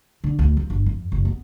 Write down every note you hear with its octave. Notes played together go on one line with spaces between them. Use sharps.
D3
D2
F3
G1
F2
F#1
B3